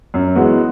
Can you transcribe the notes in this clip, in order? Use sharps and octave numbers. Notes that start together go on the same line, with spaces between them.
F#2
E3 G#3 B3 F#4